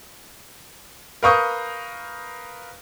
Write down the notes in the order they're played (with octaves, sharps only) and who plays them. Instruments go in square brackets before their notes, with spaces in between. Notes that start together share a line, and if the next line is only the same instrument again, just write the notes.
[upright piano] A#4 B4 F5 C#6 D#6 G6